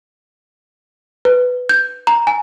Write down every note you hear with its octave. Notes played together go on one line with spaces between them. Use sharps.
B4
G6
A#5
G#5